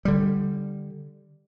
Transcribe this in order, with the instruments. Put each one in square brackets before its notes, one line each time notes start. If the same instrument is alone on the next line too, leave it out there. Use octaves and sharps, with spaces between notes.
[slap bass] D3 G3